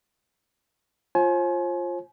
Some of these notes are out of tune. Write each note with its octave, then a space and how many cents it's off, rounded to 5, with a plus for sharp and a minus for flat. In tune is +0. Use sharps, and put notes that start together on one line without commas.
F4 +0 C5 +40 G#5 +35